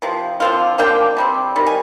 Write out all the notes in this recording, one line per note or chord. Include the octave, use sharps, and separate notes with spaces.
C3 F3
D3 F3 C4 F4
D3 F3 A#3 D4 G5
C3 G3 C4
D#3 G3
G#5